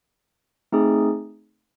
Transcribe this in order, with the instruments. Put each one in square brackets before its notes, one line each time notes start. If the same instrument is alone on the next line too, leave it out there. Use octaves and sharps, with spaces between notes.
[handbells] A3 C4 D#4 G#4